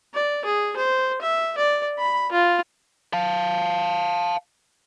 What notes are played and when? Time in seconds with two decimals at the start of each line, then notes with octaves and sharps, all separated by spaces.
0.14 D5
0.45 G#4
0.77 C5
1.22 E5
1.58 D5
1.99 B5
2.32 F4
3.13 F5 A5